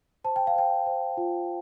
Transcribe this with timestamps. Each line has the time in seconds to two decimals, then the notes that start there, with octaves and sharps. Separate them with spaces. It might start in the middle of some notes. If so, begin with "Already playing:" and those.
0.24 C5 A5
0.36 G5
0.47 F5
0.56 C5 G5
0.87 C5
1.17 F4